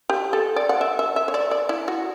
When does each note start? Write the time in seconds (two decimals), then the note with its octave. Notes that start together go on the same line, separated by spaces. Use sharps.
0.10 G4
0.33 A4
0.56 D5
0.69 F#5
0.81 E5
0.99 E5
1.16 E5
1.28 C#5
1.34 D5
1.51 D5
1.69 E4
1.88 F#4